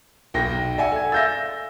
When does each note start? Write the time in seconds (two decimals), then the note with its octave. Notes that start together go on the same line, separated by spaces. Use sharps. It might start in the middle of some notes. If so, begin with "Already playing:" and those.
0.34 B1 G5 A#6
0.78 D5 E5 F#5 G#5
0.92 A4 G#6
1.12 E5 F5 E6 G6 A6 A#6